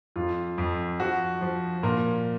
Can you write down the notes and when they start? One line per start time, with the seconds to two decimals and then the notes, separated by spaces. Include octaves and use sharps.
0.16 F2 F4
0.58 F2
1.00 F3 F#4
1.41 F3
1.83 A#2 A#4